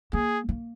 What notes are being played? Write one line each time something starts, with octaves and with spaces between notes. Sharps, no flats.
A#3 G#4
A#3